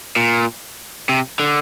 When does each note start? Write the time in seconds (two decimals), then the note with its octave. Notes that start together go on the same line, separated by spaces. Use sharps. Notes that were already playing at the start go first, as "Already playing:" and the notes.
0.16 A#2
1.09 C3
1.40 D3